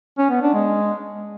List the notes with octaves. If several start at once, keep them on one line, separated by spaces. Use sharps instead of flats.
C#4
B3
D4
G#3